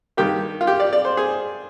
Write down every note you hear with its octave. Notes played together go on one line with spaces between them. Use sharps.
G2 D#3 A#3 G4
F4
G4
D5
D5
C5
G#4